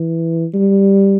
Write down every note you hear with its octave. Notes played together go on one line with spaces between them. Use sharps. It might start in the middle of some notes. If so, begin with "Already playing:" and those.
Already playing: E3
G3